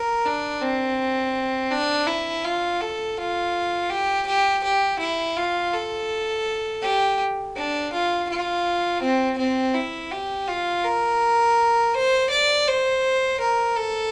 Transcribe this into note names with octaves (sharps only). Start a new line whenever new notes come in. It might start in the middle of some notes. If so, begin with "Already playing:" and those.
Already playing: A#4
D4
C4
D4
E4
F4
A4
F4
G4
G4
G4
E4
F4
A4
G4
D4
F4
F4
C4
C4
E4
G4
F4
A#4
C5
D5
C5
A#4
A4